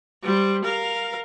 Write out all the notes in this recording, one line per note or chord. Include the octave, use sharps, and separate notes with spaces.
G3 C5
A#4 F5